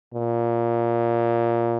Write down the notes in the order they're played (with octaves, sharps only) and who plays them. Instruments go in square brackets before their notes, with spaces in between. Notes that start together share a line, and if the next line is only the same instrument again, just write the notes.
[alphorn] A#2